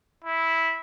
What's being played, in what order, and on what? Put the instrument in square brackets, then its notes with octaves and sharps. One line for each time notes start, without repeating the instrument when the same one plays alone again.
[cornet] E4